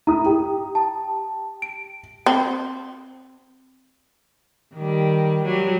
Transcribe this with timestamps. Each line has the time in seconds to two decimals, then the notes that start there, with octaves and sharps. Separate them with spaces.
0.07 E4 A#5 D#6
0.26 G4
0.75 A5
1.62 D7
2.26 C4
4.75 D#3 G3
5.45 F#3 G3